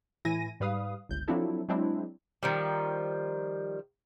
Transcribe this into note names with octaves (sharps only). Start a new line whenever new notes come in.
A2 E3 E4 G#5 A#6 D#7
G#2 G3 B4 F5 D#6
G1 C#2 G6
F3 F#3 C4 D4 E4 A4
F#3 G#3 C4 D4 E4
D#3 F3 G3